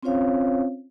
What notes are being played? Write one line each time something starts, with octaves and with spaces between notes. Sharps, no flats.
C4 C#4 F4 C5 C#5 F5